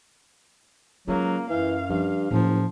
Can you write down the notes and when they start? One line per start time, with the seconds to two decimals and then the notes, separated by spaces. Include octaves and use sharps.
1.07 C#2 F#3 A#3 F4
1.50 F#2 E3 F5
1.89 G2 F3
2.31 F#1 A2 F3